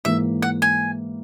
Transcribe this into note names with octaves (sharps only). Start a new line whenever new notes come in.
G#2 E3 A#3 E5
F#5
G#5